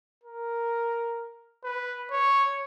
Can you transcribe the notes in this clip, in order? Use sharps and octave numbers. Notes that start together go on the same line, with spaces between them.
A#4
B4
C#5